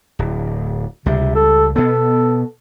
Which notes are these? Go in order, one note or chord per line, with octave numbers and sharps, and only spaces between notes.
D1
C#2 C3 G3
A4
B2 B3 A4